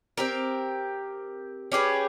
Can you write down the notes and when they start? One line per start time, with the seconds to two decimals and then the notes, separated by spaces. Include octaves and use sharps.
0.17 C4 G4 A#4
1.72 C#4 G4 G#4 B4